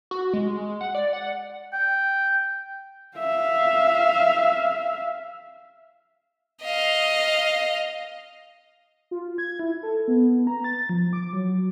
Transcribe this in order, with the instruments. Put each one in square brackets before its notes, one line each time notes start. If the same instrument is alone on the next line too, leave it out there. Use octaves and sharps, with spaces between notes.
[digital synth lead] F#4
G#3
F#5
D5
F#5
[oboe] G5
[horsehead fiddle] E5 F5
[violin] D#5 F5
[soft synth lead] F4
G#6
E4
A4
B3
A#5
A6
F3
D6
F#3